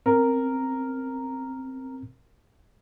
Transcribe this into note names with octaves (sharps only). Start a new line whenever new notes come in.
C4 A#4